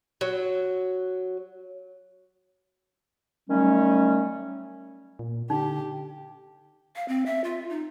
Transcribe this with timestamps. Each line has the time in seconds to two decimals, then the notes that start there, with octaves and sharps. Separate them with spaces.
0.21 F#3
3.49 D#3 F#3 G3 A3 C#4
5.19 A#2
5.50 D3 D#4 G4
6.96 F5
7.08 C4
7.26 E5
7.44 F4
7.70 D#4